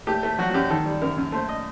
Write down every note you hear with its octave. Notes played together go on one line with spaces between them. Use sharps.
A3 G4
A3
F#3 F#4
F#4
F#2 G4
D#3 A4
G3
F#2 A#4
F#2
A3 C5
D#5